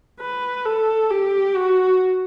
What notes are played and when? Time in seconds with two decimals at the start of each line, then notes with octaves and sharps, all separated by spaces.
0.21 B4
0.66 A4
1.11 G4
1.56 F#4